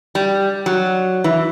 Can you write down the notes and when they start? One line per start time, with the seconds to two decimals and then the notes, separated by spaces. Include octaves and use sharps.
0.15 G3
0.66 F#3
1.24 E3